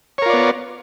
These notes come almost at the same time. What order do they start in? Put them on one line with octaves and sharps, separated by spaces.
C#5 A#4 F4 D5 B3